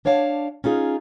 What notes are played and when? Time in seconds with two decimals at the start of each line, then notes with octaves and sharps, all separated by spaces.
0.05 D4 C#5 D5 F5 A5
0.64 C#4 D#4 F4 G#4